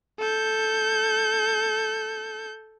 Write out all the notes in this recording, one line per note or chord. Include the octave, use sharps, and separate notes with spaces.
A4 G6